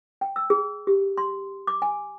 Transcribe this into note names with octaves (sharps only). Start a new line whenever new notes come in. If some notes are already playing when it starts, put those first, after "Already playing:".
G5
E6
G#4
G4
C6
D6
G#5